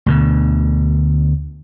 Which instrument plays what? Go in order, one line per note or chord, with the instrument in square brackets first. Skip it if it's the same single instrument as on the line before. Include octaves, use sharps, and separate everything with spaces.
[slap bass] D2 B2 D3